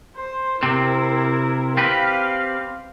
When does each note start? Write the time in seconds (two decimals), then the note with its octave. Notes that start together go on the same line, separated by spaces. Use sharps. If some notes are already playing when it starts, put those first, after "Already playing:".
0.16 C5
0.63 C3 C4 E4 A#4
1.77 C4 G4 B4 F5